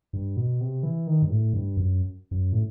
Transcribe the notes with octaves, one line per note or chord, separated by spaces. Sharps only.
G2
B2
C3
E3
D#3
G2
A2
G2
F#2
F#2
A2